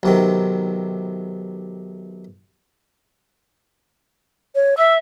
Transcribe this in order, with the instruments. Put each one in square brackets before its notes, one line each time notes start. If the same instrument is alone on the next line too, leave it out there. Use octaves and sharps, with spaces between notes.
[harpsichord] B1 C3 D#3
[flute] C#5
[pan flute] E5 [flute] E6